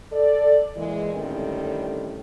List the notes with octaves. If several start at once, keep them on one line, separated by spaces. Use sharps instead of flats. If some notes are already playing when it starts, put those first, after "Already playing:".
A4 D5
A#2 E3 G#3
A2 D3 D#3 G3 C4 C#4